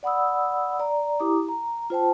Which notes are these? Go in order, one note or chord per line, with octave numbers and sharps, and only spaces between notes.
D5 F#5 B5 D#6 E6
D5 A#5
E4 G4 A#5 D6 D#6
A#5
F4 C5 G5 A5